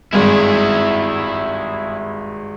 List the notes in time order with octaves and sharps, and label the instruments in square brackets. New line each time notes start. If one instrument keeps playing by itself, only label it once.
[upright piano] G#1 G2 G#3 [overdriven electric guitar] E4 G#4